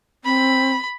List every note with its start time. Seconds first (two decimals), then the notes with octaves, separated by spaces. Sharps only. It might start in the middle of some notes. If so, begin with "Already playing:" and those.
0.25 C4 B5